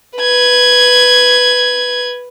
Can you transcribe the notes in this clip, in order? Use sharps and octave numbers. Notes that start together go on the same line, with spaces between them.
B4 G#6